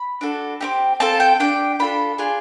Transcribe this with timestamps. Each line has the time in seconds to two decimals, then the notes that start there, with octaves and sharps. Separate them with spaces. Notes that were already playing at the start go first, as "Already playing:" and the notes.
Already playing: B5
0.21 D4 F#4 A4
0.61 C4 D#4 G4
1.00 C4 F4 A4 A5
1.20 G5
1.40 D4 G4 G5
1.79 D4 F4 A4 B5
2.18 D4 F4 G#4